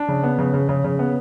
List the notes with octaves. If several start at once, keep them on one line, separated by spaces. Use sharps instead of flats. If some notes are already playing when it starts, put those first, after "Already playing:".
Already playing: D4
C#3
B3
C#3
C#3
C#3
C#3
B3